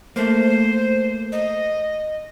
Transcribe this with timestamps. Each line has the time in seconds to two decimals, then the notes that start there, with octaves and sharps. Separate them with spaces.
0.16 A3 A#3 C5
1.32 D#5